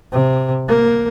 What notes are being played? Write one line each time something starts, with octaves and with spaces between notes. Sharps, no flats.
C3
A#3